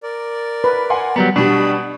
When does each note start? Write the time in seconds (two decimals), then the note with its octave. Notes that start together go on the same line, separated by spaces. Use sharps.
0.03 A#4 D5
0.64 B4
0.90 F#5 G#5 C6
1.16 F#3 G3 B3 A#5
1.36 B2 G3 D4 F#4 B5 D#6